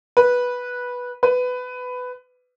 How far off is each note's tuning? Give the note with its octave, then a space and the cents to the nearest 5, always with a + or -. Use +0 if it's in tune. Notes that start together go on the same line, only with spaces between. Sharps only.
B4 -10
B4 +15